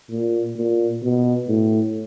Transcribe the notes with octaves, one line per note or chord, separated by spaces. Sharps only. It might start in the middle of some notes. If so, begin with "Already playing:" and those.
A#2
A#2
B2
A2